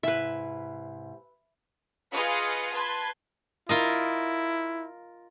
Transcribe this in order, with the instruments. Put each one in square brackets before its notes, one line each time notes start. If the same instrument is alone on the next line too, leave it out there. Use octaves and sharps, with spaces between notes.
[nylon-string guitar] G#2 C3 E4 [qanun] B4 E5
[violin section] F4 G#4 B4 D#5 F5 C#7
B4 A5 C6 G#6
[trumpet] E4 [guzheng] F4 A#4 D#5